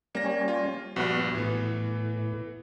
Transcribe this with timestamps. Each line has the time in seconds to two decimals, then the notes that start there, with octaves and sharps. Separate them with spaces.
0.15 G3 A#3 C#4 A#6
0.48 F4
0.96 A#1 G2 G3 B3 F#4
1.35 A2 E3 B3